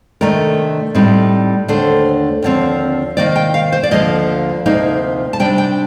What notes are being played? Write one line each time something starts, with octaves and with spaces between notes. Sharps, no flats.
C3 D#3 A3 D4 A#4
A2 G3 C4 D#4
D#2 D3 A3 D4 C5
D#2 D3 F3 C4
C3 D#3 A#3 D5
G5
F5
C5
D5
D2 D3 F3 A#3 D#5
D2 C3 F3 A#3 D#4
A5
C3 G3 D4 G5
G5